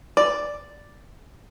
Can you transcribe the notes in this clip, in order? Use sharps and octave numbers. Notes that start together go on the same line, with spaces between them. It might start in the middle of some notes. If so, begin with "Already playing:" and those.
D5